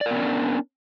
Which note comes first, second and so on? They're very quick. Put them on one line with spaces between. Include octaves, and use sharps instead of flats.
D5 A#4 B3 C#4 D4